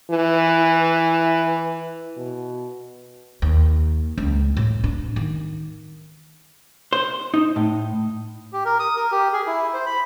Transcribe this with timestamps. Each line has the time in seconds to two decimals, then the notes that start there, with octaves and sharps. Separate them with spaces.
0.11 E3
2.17 B2
3.42 D#2
4.18 C#2
4.57 A2
4.84 D4
5.16 D#3
6.93 C5
7.34 D#4
7.56 A2
8.53 G4
8.65 A#4
8.79 D#6
8.96 A#4
9.12 G4
9.33 G#4
9.47 E4
9.74 C5
9.86 B5